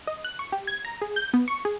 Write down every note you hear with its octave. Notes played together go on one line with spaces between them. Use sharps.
D#5
F#6
C#6
G4
G#6
A#5
G#4
G6
B3
C#6
G#4